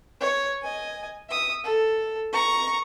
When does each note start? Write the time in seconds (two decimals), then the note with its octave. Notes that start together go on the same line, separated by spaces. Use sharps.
0.21 C#5
0.62 D#5 G#5
1.29 E5 D#6
1.64 A4
2.33 A#5 C#6